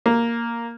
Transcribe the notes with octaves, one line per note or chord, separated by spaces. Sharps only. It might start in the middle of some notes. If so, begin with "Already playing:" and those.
A#3